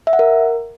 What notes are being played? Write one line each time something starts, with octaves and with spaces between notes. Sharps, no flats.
E5
F#5
A#4